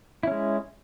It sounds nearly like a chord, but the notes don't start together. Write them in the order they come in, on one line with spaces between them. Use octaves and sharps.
E4 C#4 G#3